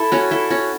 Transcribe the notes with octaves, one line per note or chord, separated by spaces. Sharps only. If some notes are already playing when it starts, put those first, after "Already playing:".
Already playing: E4 A4
C#4 F#4
E4 A4
C#4 F#4